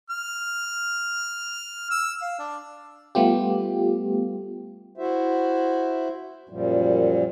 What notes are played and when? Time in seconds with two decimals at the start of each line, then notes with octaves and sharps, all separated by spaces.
0.10 F6
1.91 E6
2.22 F5
2.39 D4
3.15 G3 A3 B3 F4 G4
4.98 E4 F#4 C5 E5
6.49 F#2 A#2 F3 G3